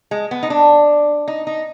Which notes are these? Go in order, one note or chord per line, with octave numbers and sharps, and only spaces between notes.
G#3
B3
D#4
D4
D#4
D#4